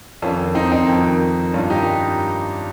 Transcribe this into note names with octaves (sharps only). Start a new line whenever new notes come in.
F2 D#3 C#4 F4
C4 D#4
C4 D#4
F2 D#3
G2 D#3 C#4 F4
D#4 G4